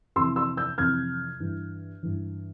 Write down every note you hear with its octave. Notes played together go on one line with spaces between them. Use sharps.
F2 C3 E3 C6 E6
C6 E6
E6 G6
F2 C3 E3 F6 G#6
G2 E3
G2 E3